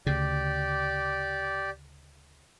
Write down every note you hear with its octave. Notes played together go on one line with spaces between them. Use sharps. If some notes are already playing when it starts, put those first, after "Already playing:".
D2 C#3 G4 D5